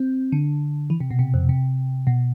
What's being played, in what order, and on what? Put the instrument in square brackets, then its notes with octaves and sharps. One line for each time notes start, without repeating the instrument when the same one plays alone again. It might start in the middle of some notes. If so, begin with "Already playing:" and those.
Already playing: [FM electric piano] C4
D3
E3
C3
B2
C3
F2
C3
B2